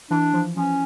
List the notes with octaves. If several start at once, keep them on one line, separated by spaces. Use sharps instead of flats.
E3 D4
F3
F3 C#4